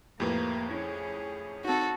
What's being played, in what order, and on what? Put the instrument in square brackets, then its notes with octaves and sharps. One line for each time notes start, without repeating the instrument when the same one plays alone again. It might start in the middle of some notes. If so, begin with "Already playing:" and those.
[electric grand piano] F2 A2 [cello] A#3 [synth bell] G4 B4
[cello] C#4 G#4 [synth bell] E4
[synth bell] C4 D#4 [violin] F#4 A4